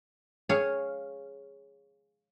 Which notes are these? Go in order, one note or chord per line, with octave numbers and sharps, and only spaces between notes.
G#4 C#5 F5